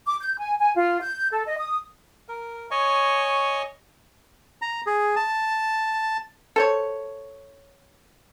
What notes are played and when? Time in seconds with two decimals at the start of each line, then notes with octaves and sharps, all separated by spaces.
0.07 D6
0.22 G6
0.38 G#5
0.59 G#5
0.76 F4
1.02 G6
1.32 A4
1.47 D#5
1.58 D#6
2.28 A#4
2.71 C#5 D#5 G#5 C#6
4.62 A#5
4.87 G#4
5.16 A5
6.56 A4 C5 C#5